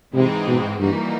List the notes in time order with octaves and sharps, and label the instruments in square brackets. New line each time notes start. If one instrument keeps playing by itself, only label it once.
[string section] G#2 E3 G#3 C4 D#4 [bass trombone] C3
[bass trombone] B2
[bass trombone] G2 [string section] E3 G3 A#3 D#4 F#4